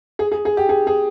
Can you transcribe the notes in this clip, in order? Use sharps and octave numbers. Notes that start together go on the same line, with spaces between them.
G#4
G#4
G#4
G4
G#4
G#4